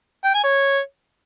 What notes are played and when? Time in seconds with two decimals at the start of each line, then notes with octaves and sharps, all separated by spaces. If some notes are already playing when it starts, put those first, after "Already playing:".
0.25 G5
0.34 G#5
0.44 C#5